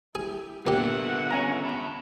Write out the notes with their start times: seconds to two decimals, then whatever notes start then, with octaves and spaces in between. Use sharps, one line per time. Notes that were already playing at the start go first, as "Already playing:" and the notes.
0.15 E4 G4 G#4
0.67 A#2 D3 B3 G4 E5 F#5
1.31 C#4 G#5 A#5
1.65 A5 B5